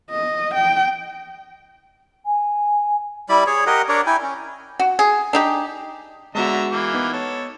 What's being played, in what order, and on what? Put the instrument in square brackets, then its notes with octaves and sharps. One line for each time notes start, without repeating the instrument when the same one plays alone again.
[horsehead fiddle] D#5
G5
[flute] G#5
[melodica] G3 E4 D5 B5
G#4 C#5
G4 A#4 D#5 F#5
D4 A#4 C#5 D5
E4 G5 G#5
C#4
[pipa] F#4
G#4
D4 D#4 G4
[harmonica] D3 E5 A#5 [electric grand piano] G#3 B3 F#4
[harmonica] E3 A#3 D6
[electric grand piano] B3 D#4
[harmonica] A4 C#5